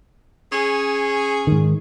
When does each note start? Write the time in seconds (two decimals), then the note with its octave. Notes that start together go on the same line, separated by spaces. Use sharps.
0.52 C#4 G#4
1.47 G#2 D#3